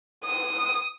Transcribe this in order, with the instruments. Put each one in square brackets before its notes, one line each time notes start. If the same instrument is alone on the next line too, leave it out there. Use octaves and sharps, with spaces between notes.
[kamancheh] D#6